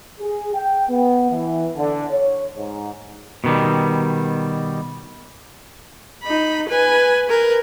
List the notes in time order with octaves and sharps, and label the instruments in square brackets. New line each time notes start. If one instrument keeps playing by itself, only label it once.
[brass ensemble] G#4
G5
B3
E3
D3
C#5
G#2
[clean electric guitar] B2 D#3 G3
[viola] D#4 B5
B4 G#5
A#4 B4